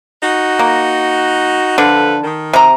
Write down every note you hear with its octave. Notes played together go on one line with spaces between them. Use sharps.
D#4 F#4
A#3
D3 F3 A4 B4
D#3
C3 A#5